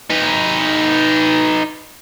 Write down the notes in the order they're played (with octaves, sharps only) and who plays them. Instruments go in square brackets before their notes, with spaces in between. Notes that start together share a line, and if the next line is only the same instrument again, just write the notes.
[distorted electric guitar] D#4 B4